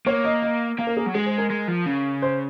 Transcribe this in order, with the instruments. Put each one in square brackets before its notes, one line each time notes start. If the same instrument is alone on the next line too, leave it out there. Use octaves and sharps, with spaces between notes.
[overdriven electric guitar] A#3 [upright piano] C#5
[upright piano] D#5
D#5
[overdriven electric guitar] A#3 [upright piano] F5
[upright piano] A#4
G#4
[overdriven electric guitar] F#3
[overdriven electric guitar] G#3 [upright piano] G#4
[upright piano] C5
A#4
[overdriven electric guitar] G#3
F3
C#3
[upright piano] C5